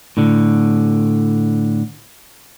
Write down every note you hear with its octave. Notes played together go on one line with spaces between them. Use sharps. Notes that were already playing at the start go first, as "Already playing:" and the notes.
A2 D3